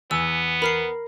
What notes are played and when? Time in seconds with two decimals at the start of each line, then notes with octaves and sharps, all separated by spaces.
0.11 E2 B3 G#5 E6
0.62 A#4 B5 F6 C7